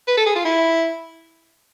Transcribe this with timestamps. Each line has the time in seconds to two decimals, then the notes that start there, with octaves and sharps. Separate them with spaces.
0.08 B4
0.17 A4
0.26 G#4
0.35 F4
0.45 E4